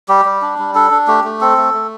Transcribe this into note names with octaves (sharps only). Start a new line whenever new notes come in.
G3 G4
G3
D4
G3
D4 A4
D4
A3 G4
A3
C4 A4
A3
A3